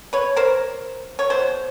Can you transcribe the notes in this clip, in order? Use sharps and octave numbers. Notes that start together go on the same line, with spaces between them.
B4 C#5
A#4 C5
C#5
B2 F#3 C5